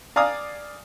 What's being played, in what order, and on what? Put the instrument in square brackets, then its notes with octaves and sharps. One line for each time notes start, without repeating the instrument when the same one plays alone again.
[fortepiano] D5 F5 G#5 A#5 D#6